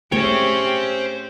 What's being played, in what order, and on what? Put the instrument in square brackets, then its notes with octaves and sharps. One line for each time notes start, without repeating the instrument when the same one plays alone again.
[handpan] A3 G#4 [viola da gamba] C#4 G4 [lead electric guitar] C5 G5 [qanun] C#5